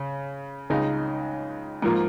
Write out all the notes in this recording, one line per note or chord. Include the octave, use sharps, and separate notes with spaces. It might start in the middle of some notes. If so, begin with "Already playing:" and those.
Already playing: C#3
C#2 C#3 G#3 D#4
G#2 F3 A#3 F4